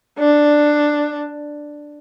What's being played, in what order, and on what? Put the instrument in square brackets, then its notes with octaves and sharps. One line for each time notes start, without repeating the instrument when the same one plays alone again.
[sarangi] D4